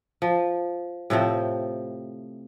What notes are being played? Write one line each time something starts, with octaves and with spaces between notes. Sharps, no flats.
F3
A2 C3 F3 C4